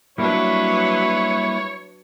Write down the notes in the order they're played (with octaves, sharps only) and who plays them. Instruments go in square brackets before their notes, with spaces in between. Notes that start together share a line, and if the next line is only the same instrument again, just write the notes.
[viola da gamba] F#3 D4 B4 [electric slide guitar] G3 A#3 [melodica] E4 [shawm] C#5